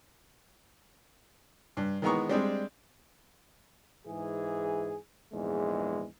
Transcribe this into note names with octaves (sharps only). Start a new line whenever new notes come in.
G2
D#3 E3 G#3 B3 A#5 C#6
G3 G#3 C4 D4
G#2 E3 G#4
A#1 E2 G#2 G#3